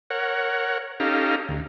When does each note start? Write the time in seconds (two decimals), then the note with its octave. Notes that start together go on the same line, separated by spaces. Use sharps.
0.10 A#4 C#5 F#5
1.00 C#4 D#4 G4 A4 F5 A#5
1.49 D2